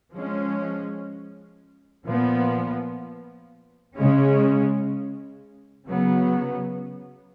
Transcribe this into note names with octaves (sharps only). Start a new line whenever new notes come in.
F3 G#3 C#4
A#2 F3 B3
C#3 G#3 C#4
C#3 F#3 B3